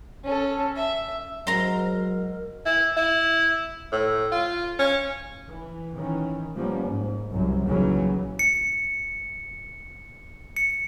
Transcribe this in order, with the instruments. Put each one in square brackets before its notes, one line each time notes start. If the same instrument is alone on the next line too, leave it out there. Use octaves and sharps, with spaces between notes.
[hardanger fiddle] C#4 A4
E5
[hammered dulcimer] G#2 [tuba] F#3 [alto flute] A#4 [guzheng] A#5 C6
[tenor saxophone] E4
E4
A2
F4
C#4
[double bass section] E3
D#3 E3 C#4
F3 G3 A#3 B3 C#4
G#2
C2 F#2 F#3
D#2 A#2 C#3 E3 F#3 C#4
[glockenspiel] C#7
C#7